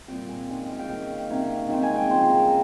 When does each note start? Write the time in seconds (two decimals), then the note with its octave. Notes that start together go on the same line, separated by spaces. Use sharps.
0.08 A#2 G3 C4 G5
0.28 G#5
0.49 D#3 G#3 C#4 G#5
0.59 G5
0.69 F5
0.79 G5
0.88 D#3 A#3 C#4
1.30 C3 D#3 A#3 C#4
1.69 D#3 G#3 C4 G5
1.83 G#5
1.96 G5
2.10 C#3 F3 C4 C5
2.29 A#4